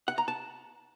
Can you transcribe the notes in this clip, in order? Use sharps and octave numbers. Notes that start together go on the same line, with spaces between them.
F#5
A#5
A5